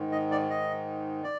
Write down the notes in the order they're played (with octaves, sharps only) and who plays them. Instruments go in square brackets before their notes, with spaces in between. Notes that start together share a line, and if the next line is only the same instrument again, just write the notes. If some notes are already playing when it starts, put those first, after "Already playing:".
Already playing: [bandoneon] G#2 D#3
D#5
D5
D#5
D5